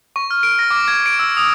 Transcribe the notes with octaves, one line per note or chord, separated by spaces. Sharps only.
C#6
F6
D7
A#6
D6
G#6
D7
E6
D#6